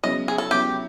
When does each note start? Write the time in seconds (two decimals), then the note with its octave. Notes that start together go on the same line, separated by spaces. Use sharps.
0.03 C#3 F#3 B3 E4 D#5
0.28 G#4
0.38 A4
0.51 C#3 F#3 B3 E4 G4